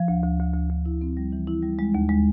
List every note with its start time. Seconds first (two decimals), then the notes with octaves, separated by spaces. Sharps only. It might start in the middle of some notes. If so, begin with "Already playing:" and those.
Already playing: F3
0.08 D2
0.24 D2
0.39 D2
0.54 D2
0.70 D2
0.86 E4
1.01 C4
1.17 G3
1.32 E3
1.47 E4
1.62 G3
1.79 G#3
1.95 D#2
2.09 G#3